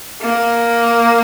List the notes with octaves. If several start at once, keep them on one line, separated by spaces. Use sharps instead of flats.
A#3